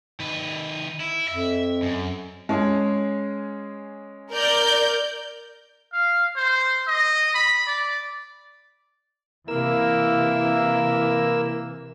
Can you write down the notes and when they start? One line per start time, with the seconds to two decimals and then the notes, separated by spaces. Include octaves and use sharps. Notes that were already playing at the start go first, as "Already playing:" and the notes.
0.20 D#3 B4
1.00 E4
1.28 F2 E5
1.82 F#2
2.49 G#3 C#4 G#4
4.31 A#4 D5 G6
5.93 F5
6.36 C5
6.87 D#5
7.34 B5
7.67 D5
9.48 C3 E3 A#3 E4 A#4 E6